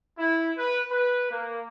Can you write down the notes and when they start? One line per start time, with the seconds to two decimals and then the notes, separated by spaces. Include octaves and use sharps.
0.18 E4
0.57 B4
0.91 B4
1.31 A#3